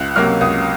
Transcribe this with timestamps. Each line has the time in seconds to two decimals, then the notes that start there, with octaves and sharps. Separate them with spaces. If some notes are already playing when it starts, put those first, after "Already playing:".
Already playing: C#2 F#6
0.16 C3 F#3 A#3 F6
0.41 C#2 D#6